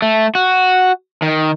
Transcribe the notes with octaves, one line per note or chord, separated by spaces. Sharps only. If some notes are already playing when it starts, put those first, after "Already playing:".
A3
F#4
D#3